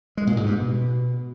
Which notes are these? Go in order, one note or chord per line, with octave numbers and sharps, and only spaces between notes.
G#3
A#2
G#2
G2
B2